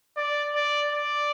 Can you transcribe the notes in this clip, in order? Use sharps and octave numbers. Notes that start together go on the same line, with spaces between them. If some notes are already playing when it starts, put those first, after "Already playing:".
D5
D5
D5